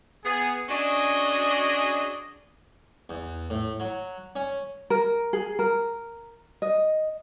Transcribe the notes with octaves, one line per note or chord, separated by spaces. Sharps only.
B3 G#4
C#4 D4 F#4 G#4 D#5
E2
A2
F#3
C#4
A#4
G#4
A#4
D#5